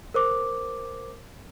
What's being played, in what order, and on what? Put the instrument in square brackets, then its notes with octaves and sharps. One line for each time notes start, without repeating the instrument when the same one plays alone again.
[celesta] A#4 C5 D6